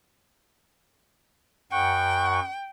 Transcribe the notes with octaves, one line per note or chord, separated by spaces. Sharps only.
F#2 F#5 G5 C#6